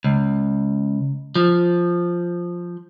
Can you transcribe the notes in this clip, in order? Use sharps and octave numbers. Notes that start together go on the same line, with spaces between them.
C#2
F3